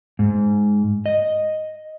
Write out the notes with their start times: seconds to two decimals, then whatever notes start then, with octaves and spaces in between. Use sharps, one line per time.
0.19 G#2
1.06 D#5